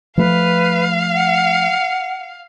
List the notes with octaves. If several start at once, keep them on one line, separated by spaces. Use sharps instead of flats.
F3 A3 B4 F5
F#5